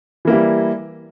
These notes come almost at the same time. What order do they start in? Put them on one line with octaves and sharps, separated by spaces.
E3 A#3 E4 G3